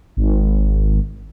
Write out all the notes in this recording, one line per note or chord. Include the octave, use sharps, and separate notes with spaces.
G#1